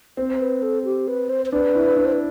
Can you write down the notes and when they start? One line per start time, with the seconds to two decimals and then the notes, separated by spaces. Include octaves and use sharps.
0.17 C4 C5
0.33 C5
0.41 B4
0.63 A4
0.84 G4
1.08 B4
1.29 C5
1.46 C5
1.52 D4 B4
1.75 E4
1.97 D4
2.05 C5
2.12 B4